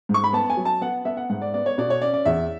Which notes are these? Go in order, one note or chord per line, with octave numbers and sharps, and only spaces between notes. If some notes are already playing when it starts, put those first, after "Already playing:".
G#2
C#6
B5
B3 A5
G#5
F#3
A5
B3 F#5
B3 E5
F#5
G#2 F#5
D5
B3 D5
C#5
B2 D5
C#5
C#4 D5
D5
E2 E5